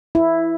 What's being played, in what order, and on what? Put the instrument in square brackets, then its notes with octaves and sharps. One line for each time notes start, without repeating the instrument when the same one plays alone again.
[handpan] E4